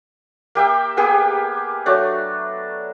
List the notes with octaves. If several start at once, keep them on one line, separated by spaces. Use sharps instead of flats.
A#3 G4 E5 G5
A#3 B3 G4 G#4
F#3 A3 D4